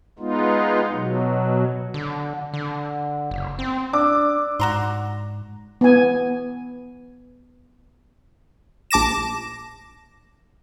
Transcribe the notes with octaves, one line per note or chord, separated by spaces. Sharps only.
G#3 B3 D#4 F4
B2 F#3
D3
D3
F#1
C4
D4 D5 D6 E6 F#6
G#2 F#4 A#5 C6
B3 G#5
A#1 A5 D6 A#6 E7